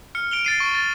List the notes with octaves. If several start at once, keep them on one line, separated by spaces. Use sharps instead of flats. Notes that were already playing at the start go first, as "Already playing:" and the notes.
F6 C#7
D7 F7 G7
A6 C7 D#7
C#6
A6